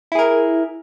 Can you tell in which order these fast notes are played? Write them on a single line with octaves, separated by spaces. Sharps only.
E4 G#4 A#4